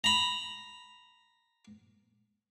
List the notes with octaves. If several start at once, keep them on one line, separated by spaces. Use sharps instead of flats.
A#5 B5